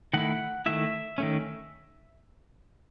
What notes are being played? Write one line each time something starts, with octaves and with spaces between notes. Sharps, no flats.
D#3 A3 E4 F#5
D#3 A3 E4 E5
D#3 A3 C#4